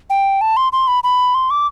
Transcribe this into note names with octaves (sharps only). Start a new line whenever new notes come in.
G5
A5
C6
C6
B5
B5
C6
D6